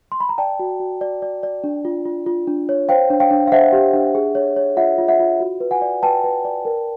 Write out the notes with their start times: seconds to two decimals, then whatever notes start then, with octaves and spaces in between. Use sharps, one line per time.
0.12 C6
0.20 B5
0.29 A#5
0.38 D5 G5 A5
0.59 F#4
0.80 F#4
1.01 D5
1.22 D5
1.43 D5
1.64 D4
1.85 F4
2.05 F4
2.26 F4
2.47 D4
2.69 C#5
2.89 C5 F5 G5
3.10 D4
3.20 F5 G5
3.31 D4
3.47 F5
3.52 C5 E5 F#5
3.72 G4
3.94 D4
4.15 G#4
4.35 C#5
4.56 C#5
4.77 F4 E5 F#5
4.98 F4
5.08 E5 F#5
5.20 F4
5.40 F#4
5.60 B4
5.71 F#5 G#5
5.82 D5
6.03 B4 G5 A5
6.24 B4
6.45 D5
6.65 A#4